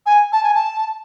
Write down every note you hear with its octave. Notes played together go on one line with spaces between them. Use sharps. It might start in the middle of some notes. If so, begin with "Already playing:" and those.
G#5
A5
G#5
A5